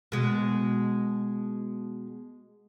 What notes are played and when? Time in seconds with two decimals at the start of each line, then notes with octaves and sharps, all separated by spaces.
0.12 B2 G#3